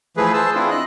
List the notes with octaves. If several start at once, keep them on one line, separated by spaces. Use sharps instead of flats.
E3 F3 A3 G#4 B4
G#4 C5 A5 E6
C4 D4 E4 F4
D#5 F#6